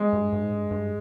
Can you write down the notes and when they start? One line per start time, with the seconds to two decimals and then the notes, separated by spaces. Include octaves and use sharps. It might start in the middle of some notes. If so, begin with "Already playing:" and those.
Already playing: G#3
0.13 G2
0.32 G2
0.43 G#2
0.52 G2
0.71 G2